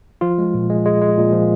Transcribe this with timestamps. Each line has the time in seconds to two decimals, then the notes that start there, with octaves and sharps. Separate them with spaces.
0.21 F3 F4
0.38 G#3
0.54 A#2
0.69 G#3
0.85 G#3
1.01 G#3
1.17 A#2
1.33 F3